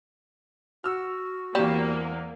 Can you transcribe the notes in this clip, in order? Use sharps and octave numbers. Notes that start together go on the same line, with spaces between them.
F#4 E6 F6
E2 G3 A#3 C4 E7